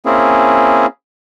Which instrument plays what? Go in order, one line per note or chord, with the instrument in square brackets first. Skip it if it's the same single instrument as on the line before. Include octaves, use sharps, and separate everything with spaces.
[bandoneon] A#3 C4 C#4 E4 G#4